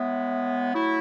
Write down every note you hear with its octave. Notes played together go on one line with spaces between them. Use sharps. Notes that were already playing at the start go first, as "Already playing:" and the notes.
Already playing: A2 G#3 B3 E4
F#3 A3 E4